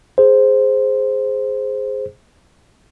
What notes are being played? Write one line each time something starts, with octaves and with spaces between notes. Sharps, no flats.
G#4 C5